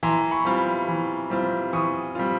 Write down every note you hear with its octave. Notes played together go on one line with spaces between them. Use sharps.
E3 A#5 C6
B5 C#6
G3 C4 F4
E3
G3 C4 F4
E3 C#6 D#6
G3 C4 F4